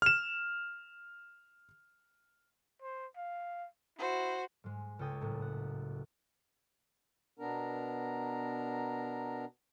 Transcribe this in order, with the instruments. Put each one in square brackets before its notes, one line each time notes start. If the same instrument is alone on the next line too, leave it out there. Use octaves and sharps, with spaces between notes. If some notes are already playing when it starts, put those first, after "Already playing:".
[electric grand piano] F6 E7
[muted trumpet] C5
F5
[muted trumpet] E4 [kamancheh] F#4 C5
[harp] G#2 G#3
C#2 C#4 A4 G5 D#6 G#6
F#1 F#2 A2
F#5
[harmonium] B2 B3 D4 A#4 A#5